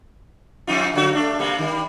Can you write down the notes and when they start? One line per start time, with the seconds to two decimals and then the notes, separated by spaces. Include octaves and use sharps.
0.67 F2 D#4 F4
0.94 D3 F#3 F#4
1.13 A3 D4
1.39 C3 G3 A#3
1.58 D#3 G3